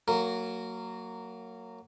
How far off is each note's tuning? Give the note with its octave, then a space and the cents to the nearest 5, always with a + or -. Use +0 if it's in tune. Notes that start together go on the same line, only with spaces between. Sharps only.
F#3 +0 A#3 -20 A#4 -15